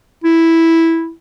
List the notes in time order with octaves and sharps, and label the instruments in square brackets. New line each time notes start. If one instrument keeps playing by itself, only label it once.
[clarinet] E4